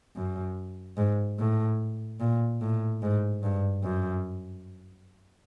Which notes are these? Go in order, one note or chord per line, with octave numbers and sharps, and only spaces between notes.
F#2
G#2
A2
A#2
A2
G#2
G2
F#2